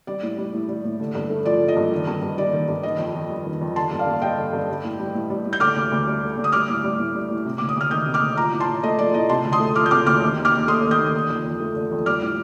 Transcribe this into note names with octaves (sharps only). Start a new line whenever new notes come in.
G3 D5
A2
G3
A2
G3
A2
D3
G2
A3
F3 D5
D3
D#5
G2
D#3
G2
G2
G3 D5
D#3
G2
D#3 D#5
F2
F2
G3
D#3
F2
D3 A5 C6
G2
D5 F5
G2
G3 D#5 G5
D3
G2
G3
A2
G3
A2
G3
A2
G6
D3 D6 F6
D2
D2
G3
D3
D2
D#6
G3 D6 F6
A2
G3
A2
G3
A2
C3
D2 D6
D#6
D2 F6
D#3 D#6 G6
C3
D6 F6
D2
F3 A#5 D6
A2
A5 C6
A2
A3 D#5
F3 D5
A2 D#5
C3 A5 C6
D2
C6 D#6
A3
F3 D6 F6
G6
C3 D6 F6
D2 D6 F6
D#3
D#2
D6 F6
D#2
A3 C6 D#6
D#3
D#6 G6
D#2
D3
F2
F2
A3
D3
F2
G3 D6 F6
A2